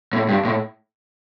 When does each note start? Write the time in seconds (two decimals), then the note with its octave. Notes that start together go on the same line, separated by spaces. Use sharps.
0.13 A2
0.29 G2
0.45 A2